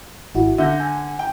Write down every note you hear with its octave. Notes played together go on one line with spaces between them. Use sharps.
G#1 E4 F#4
D3 E5 G6 A#6
G#5
G5